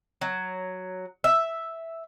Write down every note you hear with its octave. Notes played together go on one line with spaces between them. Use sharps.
F#3
E5